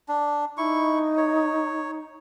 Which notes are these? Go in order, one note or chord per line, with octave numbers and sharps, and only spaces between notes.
D4
D#4 E4 C#6
C#5